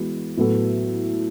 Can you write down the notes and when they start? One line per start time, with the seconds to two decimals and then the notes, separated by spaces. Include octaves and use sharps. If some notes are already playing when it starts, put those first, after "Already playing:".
Already playing: E3 G#3 B3 F#4 B4
0.37 A2 F#3 B3 E4 A4